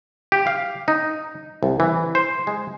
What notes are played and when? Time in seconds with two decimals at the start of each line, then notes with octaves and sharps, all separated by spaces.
0.32 G4
0.47 F5
0.88 D#4
1.63 C2
1.80 E3
2.15 C5
2.47 G#3